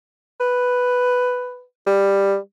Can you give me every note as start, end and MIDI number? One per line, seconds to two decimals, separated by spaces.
0.40 1.63 71
1.86 2.36 55